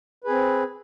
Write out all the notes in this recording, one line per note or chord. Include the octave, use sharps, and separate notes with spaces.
C4 G#4 B4